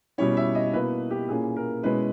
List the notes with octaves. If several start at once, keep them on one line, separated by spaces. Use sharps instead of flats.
B2 G3 C#4 E4 C#5
E5
D#5
B2 A#3 E4 B4
G4
A#2 A#3 C#4 E4 G#4
A#4
B2 G#3 C#4 E4 B4